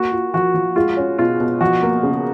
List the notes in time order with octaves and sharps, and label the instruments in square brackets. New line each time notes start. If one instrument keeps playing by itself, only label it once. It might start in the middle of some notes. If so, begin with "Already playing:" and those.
Already playing: [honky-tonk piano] A#3 [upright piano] F#4
[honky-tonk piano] F4
[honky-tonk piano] F3 [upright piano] F#4
[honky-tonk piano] F3
[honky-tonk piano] G#3 [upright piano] F4
[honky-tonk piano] C#4
[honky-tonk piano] B2 [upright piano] F4
[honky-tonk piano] B2
[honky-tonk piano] F3 [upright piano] F#4
[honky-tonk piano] A#3
C#3